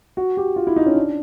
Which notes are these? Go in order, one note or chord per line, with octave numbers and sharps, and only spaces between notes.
F#4
G4
F4
E4
D#4
C#4
D4